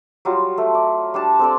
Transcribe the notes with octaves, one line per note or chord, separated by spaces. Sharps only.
F#3 G3 F4 F#4
A3
D5
G3 D4 A5
C4 A4 D5